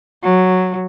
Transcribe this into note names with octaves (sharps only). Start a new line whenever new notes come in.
F#3